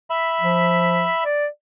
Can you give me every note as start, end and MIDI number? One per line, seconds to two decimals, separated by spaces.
0.10 1.24 76
0.10 1.24 83
0.41 1.09 53
1.24 1.47 74